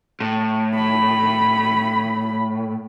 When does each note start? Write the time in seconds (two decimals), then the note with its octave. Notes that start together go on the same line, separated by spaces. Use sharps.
0.20 A2
0.75 B5